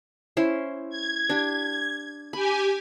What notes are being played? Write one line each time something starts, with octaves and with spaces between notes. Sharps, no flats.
C#4 E4 C5
G#6
D4 G4
G4 G#5 B5